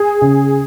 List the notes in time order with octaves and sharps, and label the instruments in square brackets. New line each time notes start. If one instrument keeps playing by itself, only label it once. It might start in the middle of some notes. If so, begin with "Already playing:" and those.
Already playing: [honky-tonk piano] G#4
[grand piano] C#3